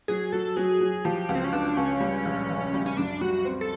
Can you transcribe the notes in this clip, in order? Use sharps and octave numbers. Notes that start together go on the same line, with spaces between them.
F#3 G#4
F#3 A4
F#3 G#4
F#3
F3 G4
C#2
C4
C#4
C#2 D4
C#2 C#4
G3
A#1
A#1
G3
C#4
F#2 D4
G3 F#4
C4
A4